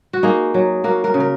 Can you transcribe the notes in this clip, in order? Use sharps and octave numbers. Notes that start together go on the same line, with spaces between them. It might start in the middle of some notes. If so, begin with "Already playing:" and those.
F#4
A#3 D#4 G#4
F#3
A#3 F#4 A#4
F#4 A#4
C#3
A#4